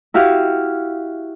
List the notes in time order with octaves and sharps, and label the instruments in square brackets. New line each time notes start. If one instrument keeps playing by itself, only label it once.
[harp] E4 F#4 G4 F5